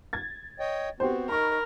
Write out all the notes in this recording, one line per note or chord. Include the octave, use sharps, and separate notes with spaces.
G#6 A6
C#5 D#5 G5
B3 C4 F#4 G4 C5
D#4 A#4 B5 C#6